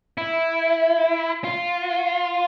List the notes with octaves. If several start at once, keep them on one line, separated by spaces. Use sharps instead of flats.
E4
F4